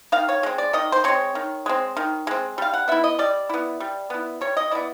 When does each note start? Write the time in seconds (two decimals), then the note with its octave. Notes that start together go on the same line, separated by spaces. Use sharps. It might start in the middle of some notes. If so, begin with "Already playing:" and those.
0.12 D#3 F5
0.29 C#5
0.43 G#3 C4
0.58 D5
0.73 D#3 D#5
0.92 C5
1.04 G#3 C4 C#5
1.35 D#3
1.66 G#3 C4
1.97 D#3
2.27 G#3 C4
2.58 G3 F5
2.74 F#5
2.88 B3 E4 E5
3.04 D#5
3.19 G3 D5
3.49 B3 E4
3.80 G3
4.10 B3 E4
4.41 G3 C#5
4.57 D#5
4.71 B3 E4 D5